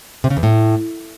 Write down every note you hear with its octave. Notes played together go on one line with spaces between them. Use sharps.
C3
C#3
E2
A2